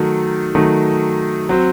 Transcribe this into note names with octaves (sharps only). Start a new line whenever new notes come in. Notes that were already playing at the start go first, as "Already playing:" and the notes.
Already playing: D#3 F#3 A3
D#3 F#3 A3
F#3 C4